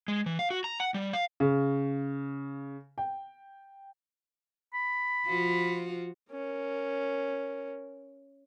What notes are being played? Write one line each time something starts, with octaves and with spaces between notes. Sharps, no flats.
G#3
E3
F5
F#4
A#5
F#5
G3
F5
C#3
G5
B5
F3 F4 F#4
C#4 A#4